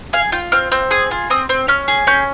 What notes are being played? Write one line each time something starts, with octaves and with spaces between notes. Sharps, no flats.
G#4 F5
F4 G5
C4 F6
C4 G6
G#4 D#6
F4
C4 D#6
C4
C#4 F6
G#4
C#4 G6